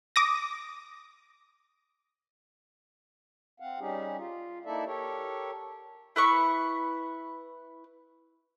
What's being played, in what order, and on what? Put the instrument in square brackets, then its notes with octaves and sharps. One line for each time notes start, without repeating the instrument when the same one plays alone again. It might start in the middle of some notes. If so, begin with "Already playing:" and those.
[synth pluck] D6 D#6 A#6
[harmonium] C4 F5 F#5
G3 C#4 D#4 G4 G#4
F4
A#3 D#4 E4 A4 D5 E5
G4 A4 A#4 C#5
[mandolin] E4 B4 C#6